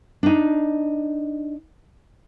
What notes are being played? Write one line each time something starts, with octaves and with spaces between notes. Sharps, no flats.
D4 D#4